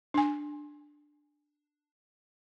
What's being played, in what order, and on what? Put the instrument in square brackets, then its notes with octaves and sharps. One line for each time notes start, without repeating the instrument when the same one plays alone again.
[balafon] D4 G#5